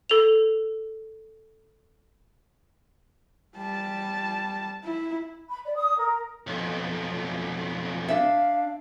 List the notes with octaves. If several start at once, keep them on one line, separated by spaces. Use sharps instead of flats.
A4 F7
G3 A5
E4
B5
D5
D#6
A#4
B1 F2
D4 E5 F5